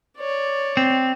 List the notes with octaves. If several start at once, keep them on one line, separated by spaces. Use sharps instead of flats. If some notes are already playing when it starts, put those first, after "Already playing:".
C#5 D5
C4